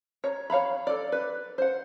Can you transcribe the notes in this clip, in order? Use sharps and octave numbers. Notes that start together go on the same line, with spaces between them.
C#5 A#5
C#5 F5 A#5 B5
A4 D5
B4
C5 F#5